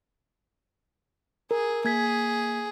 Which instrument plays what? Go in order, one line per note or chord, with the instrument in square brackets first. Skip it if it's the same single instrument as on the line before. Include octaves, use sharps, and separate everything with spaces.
[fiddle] G#4 [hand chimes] A#4
[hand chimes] A#3 G#6 B6 [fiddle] G#4